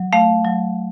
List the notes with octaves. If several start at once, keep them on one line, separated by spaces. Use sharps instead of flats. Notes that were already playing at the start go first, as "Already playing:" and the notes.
Already playing: F#3
A3 F5
F#3